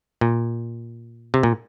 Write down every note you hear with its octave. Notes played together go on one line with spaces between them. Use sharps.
A#2
C3
A#2